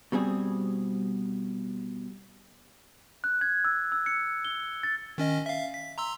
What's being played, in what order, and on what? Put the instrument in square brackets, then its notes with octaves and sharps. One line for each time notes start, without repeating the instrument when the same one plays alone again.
[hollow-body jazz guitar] B2 G3 C4 G#4
[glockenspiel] F#6
G#6
E6
E6
C#7
G7
A6
[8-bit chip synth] D#3 C#4 D#5
E5 F5
B6
A#5 C6 E6